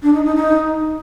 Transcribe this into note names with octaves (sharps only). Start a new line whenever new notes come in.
D4
D#4
D#4
D#4